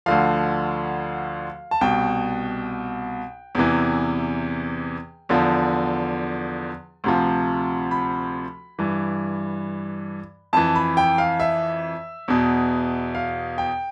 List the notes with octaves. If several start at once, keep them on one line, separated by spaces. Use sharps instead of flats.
D2 D3 F3 F5
A5
C2 B2 G5
E2 C3 E3
E2 D3 F3
D2 C3 F3
B5
G2 E3
F2 E3 A5
B5
G5
F5
E5
E2 B2
F5
G5